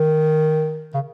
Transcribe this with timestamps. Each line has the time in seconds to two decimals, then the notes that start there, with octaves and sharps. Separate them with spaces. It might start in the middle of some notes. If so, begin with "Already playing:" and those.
Already playing: D#3
0.94 C#3